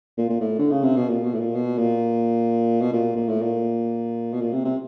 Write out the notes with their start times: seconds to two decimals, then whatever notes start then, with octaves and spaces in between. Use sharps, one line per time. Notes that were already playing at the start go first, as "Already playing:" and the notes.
0.17 A#2
0.29 A#2
0.41 A2
0.59 D3
0.71 C#3
0.84 C3
0.97 B2
1.09 A#2
1.24 B2
1.34 A2
1.40 A#2
1.55 B2
1.78 A#2
2.82 B2
2.92 A#2
3.16 A#2
3.29 A2
3.41 A#2
4.33 B2
4.41 A#2
4.53 C3
4.64 C3